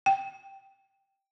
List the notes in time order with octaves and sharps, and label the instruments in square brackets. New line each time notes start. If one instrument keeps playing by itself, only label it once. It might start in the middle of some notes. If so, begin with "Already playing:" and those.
[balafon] G5